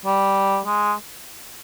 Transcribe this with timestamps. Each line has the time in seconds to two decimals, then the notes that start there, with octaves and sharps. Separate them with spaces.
0.05 G3
0.66 G#3